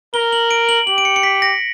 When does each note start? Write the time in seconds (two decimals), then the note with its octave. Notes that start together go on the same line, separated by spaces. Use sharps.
0.14 A#4 G7
0.33 F#7
0.51 D7
0.69 F#7
0.87 G4 F#7
0.98 D7
1.05 C#7
1.16 C#7
1.23 B6
1.42 A#6